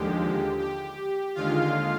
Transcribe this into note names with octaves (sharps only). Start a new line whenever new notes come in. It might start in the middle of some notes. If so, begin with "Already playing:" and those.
Already playing: D#2 D3 F3 G#3 G4
G4
D#2 D3 G#3 F4 F5